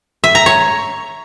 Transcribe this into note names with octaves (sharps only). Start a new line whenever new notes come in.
E5
A#5
C#5